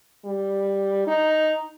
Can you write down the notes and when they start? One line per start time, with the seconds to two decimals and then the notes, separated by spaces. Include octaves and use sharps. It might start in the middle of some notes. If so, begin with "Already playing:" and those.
0.25 G3
1.07 D#4